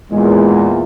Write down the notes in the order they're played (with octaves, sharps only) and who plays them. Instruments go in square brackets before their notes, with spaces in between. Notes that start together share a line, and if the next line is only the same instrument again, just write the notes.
[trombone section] E2 A#2 [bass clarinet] G#3